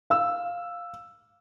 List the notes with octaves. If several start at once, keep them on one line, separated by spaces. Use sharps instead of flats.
F5 E6